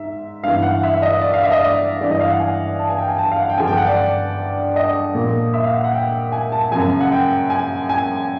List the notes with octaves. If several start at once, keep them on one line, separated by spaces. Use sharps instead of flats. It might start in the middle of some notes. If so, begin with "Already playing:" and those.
Already playing: G#2 E5
G2 E3 F5
F#5
E5
D#5
D5
F5
E5
D#5
D5
G2 E3 D5
D#5
F5
F#5
G#5
A5
G#5
G5
G#5
A5
F5
F#5
G5
G2 D3 F3 G#5
G5
F#5
D5
D#5
A#2 F3
E5
F5
F#5
F#5
G5
G#5
A5
F#2 C#3 F3 G#5
F#5
G5
G#5
G#5